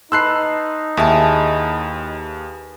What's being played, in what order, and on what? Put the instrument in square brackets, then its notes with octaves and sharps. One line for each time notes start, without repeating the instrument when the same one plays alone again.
[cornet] D#4 [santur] B4 A5 C6 [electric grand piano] E6 F#6 C7
[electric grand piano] D#2 [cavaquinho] E4 C#5 A5 [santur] G#4